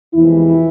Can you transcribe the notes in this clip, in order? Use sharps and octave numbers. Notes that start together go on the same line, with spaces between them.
E2 C3 E3 F3 G#3 E4